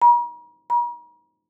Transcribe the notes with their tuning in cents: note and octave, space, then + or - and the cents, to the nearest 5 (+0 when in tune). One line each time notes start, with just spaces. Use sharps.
A#5 +45
A#5 +45